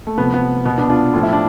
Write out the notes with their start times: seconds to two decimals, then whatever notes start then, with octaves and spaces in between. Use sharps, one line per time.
0.07 A3
0.18 C3 F3 B3
0.34 B3
0.65 B2 B3
0.78 B3 D4
0.90 D4 F4
1.13 A2 F3 F4
1.23 E4
1.33 D4